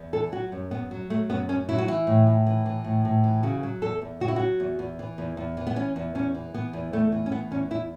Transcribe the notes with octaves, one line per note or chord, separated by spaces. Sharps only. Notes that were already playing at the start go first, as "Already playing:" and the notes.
Already playing: E2
E3 A4
F#3 F#4
F#2
F#2 B3
F#3
F#3 A3
F#2 B3
F#2 C#4
F#3 E4
F#4
E3 E4
A2
A2
E3
E3
A2
A2
E3
C#3 F#4
F#3
E2 A4
E2
C#3 F#4
E4
F#3 F#4
E2
E2
E3
E2
E2
E3
B3
E3 C#4
E2
E2 C#4
E3
E3 B3
E2
E2 A3
E3
C#4
E3 B3
E2 C#4
E2 E4